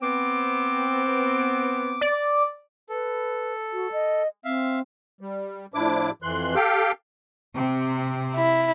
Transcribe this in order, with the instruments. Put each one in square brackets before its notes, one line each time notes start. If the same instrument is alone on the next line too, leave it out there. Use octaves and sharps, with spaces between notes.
[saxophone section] B3 C4 [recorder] D6
[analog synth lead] D5
[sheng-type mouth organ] A4 [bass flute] B4
[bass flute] F#4
D#5
[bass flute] C4 [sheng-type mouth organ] E5 F5
[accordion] G3
A2 F3 D4 E4 D6
F2 E3 C6 F#6
G4 A4 F5 G5
[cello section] C3
[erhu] E4